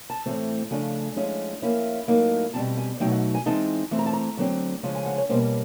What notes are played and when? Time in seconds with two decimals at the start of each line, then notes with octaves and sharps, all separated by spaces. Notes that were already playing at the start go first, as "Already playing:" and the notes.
0.10 A5
0.26 A2 E3 A3 C4
0.71 C#3 F3 A3 D4 G#5
1.16 F3 G#3 C#4 E4
1.62 F3 A#3 C#4 E4
2.08 A2 F#3 A#3 D#4
2.54 B2 G3 C4 A5
2.77 G#5
3.00 B2 F#3 A3 D#4 G5
3.12 F#5
3.35 G#5
3.46 E3 G#3 C4 D#4 A5
3.91 E3 A3 C4
3.99 A#5
4.06 A5
4.13 A#5
4.37 D3 F#3 A3 C4
4.83 C#3 F3 G#3 C#4 A5
4.95 G#5
5.06 F#5
5.18 C#5
5.29 B2 G3 A#3 C#4 C5